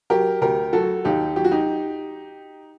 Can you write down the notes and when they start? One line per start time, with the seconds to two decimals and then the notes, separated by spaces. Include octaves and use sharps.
0.10 F#3 G4 A#4
0.41 D2 G4 A#4
0.73 F#3 F#4 A4
1.04 D#2 D#4 G4
1.36 F#3 G4
1.44 F#4
1.51 D#4 G4